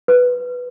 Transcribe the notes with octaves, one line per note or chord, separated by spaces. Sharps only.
B4